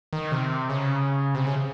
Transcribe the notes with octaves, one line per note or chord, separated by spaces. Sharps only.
D#3
C3
C#3
C3
C#3